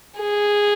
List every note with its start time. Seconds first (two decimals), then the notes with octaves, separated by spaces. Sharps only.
0.19 G#4